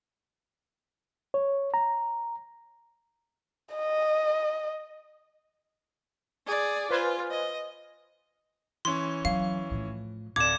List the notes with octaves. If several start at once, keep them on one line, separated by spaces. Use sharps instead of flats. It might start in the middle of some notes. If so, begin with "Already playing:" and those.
C#5
A#5
D#5
G#4 D5
F4 B4 C5 G#5
D#5
E3 C#4 C6
F#3 F5
A2 F3
D1 D5 D6 G#6 E7